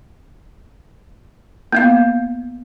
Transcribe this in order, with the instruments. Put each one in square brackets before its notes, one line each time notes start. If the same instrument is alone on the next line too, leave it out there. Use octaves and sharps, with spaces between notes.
[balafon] A#3 B3 F5